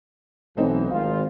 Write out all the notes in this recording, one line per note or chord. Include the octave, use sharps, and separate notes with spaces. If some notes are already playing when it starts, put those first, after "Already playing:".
B1 E3 A3 C4 D#4
G#1 F4 F5